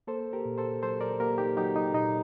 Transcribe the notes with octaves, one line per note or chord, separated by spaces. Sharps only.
A#3 A4 C5
G4 A#4
A#2
A4 C5
F#3 A4 C5
A#4 D5
A#3 G4 A#4
D#4 G4
F#3 D#4 G4
D#4
A#2 D#4